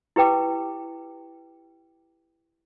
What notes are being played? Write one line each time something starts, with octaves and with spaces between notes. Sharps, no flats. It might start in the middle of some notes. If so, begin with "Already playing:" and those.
E4 G4 B4 G5 D6